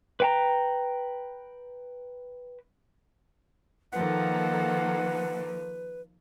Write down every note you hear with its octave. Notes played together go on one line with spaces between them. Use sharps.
B4 G5 A#5
D#3 F3 A#3 A4 B4 F#5